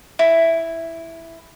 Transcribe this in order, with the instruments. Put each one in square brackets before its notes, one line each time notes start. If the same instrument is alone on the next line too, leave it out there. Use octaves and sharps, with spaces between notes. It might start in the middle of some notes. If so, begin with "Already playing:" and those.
[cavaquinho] E4